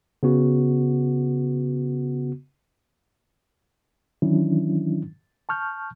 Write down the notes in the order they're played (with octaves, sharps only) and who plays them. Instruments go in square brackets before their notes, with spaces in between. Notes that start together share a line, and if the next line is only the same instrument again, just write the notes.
[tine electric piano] C#3 B3 F#4
[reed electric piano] D#3 E3 F#3 C#4 D4 E4
A5 C#6 F6 G6